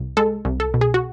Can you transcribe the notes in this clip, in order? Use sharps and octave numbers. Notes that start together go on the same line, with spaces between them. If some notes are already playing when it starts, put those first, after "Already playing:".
Already playing: C2
G#3 A4
C2
A4
B2
G#4
F#4